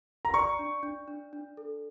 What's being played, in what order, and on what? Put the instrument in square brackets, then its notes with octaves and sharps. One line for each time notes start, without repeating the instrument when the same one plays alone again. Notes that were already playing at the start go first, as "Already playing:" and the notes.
[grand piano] A#5
[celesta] D5 [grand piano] C#6
[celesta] D4
D4
D4
D4
A4